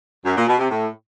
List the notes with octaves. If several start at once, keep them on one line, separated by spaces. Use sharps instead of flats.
F#2
A#2
B2
C3
A2